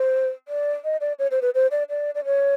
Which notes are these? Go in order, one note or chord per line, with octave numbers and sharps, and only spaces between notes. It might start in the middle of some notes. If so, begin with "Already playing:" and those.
Already playing: C5
D5
D#5
D5
C#5
C5
B4
C5
D5
D5
D5
C#5